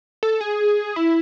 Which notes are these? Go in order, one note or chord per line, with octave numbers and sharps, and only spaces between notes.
A4
G#4
E4